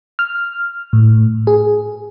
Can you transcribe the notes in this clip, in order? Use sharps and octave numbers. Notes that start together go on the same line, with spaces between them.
F6
A2
G#4